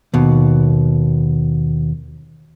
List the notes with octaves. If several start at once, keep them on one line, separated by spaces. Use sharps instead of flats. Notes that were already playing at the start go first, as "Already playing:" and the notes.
D#2 B2